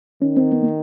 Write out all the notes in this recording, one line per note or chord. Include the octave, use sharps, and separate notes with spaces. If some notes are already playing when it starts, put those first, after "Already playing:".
D#3 C#4
C4
B3
A#3